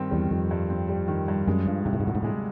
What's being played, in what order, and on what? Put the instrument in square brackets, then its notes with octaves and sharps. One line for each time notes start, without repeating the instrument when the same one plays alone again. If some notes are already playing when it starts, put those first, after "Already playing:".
Already playing: [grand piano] G2 D#3 G3 C4
[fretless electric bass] E2 [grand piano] G3
[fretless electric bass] F2 [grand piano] D#3
[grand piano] G2
C4
G3
D#3
G2
[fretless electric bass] F#2 [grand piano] G#3
[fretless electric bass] G2 [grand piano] F3
[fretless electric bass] G#2 [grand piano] C3
[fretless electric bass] A2
G#2
[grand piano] D2 [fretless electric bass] A2
[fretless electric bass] G#2
[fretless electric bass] A2 [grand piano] G#3